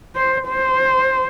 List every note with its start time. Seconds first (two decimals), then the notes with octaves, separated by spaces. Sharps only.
0.16 C5
0.47 C5